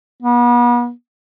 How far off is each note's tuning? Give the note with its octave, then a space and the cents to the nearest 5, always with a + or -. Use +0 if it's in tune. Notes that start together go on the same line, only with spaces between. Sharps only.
B3 -40